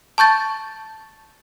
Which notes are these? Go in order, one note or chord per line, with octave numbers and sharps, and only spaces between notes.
A5 C#6 G6 A6